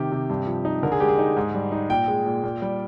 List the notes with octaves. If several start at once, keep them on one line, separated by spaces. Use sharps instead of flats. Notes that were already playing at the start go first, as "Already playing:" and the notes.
Already playing: C3 D#3 G4
C3
G2
F3
D#4
D3 A#4
G#4
G#3 G4
G#4
D#4
G#2
G3
D#4
A#2 G5
G#3
A#2
A#2
G3